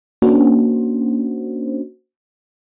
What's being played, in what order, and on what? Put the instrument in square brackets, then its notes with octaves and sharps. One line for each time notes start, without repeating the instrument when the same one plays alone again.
[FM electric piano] A#3 C#4 D4 F#4 C5